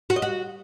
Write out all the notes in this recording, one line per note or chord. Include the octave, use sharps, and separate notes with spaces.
F#4
D#5
F#4